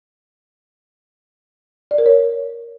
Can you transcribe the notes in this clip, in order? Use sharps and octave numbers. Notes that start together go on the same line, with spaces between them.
D5
A#4
C#5